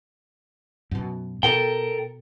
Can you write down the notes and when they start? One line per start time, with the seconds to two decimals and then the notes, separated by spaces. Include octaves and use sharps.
0.91 F#2 B2
1.43 B2 A4 A#4 G5